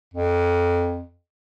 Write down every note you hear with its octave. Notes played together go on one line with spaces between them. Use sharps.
F2